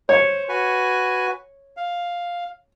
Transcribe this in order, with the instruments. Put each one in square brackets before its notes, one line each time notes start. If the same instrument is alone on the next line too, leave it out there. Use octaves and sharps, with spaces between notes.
[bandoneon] C5 [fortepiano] C#5
[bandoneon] F#4 B4 G#5
F5